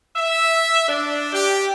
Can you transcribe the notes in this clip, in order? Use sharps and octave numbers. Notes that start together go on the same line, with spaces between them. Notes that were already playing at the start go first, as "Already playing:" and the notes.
E5
D4
G4